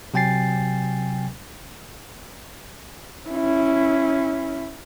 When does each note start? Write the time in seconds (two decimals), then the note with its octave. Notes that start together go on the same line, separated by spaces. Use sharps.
0.14 C3 F#3 G5 G#5 A6 C7
3.29 C#4 E4